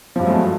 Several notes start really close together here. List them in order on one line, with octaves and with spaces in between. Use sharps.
F3 G2 F#3 A3 G#3